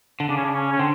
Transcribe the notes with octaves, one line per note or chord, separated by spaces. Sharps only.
D3
C#3 D4
C#4
D4
C#4
C#4
D3 C4